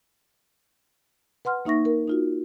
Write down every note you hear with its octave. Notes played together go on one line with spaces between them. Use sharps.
B4 F#5 C6 F6
A#3 D#4 E5 C#6 A#6
A#4
D#4 F4 F#4